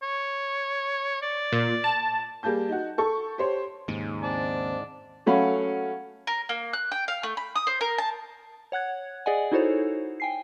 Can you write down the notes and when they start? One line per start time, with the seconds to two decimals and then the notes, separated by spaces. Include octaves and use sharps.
0.02 C#5
1.22 D5
1.52 A#2
1.84 A5
2.43 G3 A#3 G#4 A5 G6
2.69 D#4 F#4
2.98 A4 C#6
3.38 G4 C5 C#5
3.88 D#2 G#2 C#3
4.23 C4 D5 A5
5.26 F#3 A3 C#4 F5 F#5 B5
6.27 A#4
6.49 A#3
6.73 F#6
6.92 G5
7.08 F5
7.23 A3
7.37 B5
7.55 D#6
7.67 C5
7.81 A#4
7.98 A5
8.72 C#5 F#5 F#6 G#6
9.26 G#4 D5 D#5 F#5 G#5
9.52 D#4 E4 F#4 A4 C5 C#5
10.20 G5 G#5 C7